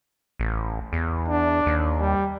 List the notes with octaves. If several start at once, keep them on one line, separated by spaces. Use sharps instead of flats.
A1
E2
D4
D#2
G3